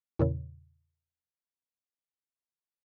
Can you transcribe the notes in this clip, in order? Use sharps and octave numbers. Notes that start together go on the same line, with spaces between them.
E2 A#2 C#3